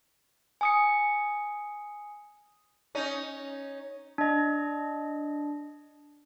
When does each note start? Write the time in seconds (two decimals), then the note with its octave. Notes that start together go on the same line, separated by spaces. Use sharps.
0.61 G#5 D#6 C#7
2.95 C#4 D#4
4.18 D4 D#5